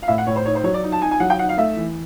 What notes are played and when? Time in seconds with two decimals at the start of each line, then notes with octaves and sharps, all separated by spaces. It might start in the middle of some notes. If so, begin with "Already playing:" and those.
0.03 F5
0.08 A2 E5
0.18 F#5
0.27 A2 C#5
0.36 C5
0.45 D#4 C#5
0.55 C5
0.64 F#3 C#5
0.74 D5
0.84 D#4
0.92 A5
1.01 D#4 G#5
1.11 G#5
1.20 F#3 F#5
1.30 G5
1.39 D#4 F#5
1.49 F5
1.57 A3 E5
1.76 E3